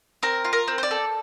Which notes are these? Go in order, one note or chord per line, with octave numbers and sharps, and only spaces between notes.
C4 A#4
F4
A#4
C4
C5
D5
A4